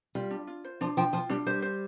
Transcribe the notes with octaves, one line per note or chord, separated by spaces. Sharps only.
G3 F4
D4
F4
C5
F3 D4
F3 G5
F3 F4
G3 D4
G3 C5
C5